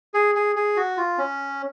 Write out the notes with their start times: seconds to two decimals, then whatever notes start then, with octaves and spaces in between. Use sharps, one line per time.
0.14 G#4
0.35 G#4
0.56 G#4
0.77 F#4
0.97 F4
1.18 C#4